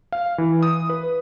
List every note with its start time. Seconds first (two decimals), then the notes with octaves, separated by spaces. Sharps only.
0.12 F5
0.38 E3
0.63 D#6
0.89 B4